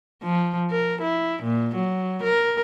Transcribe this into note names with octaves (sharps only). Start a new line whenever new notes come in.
F3
A#4
E4
A#2
F#3
A#4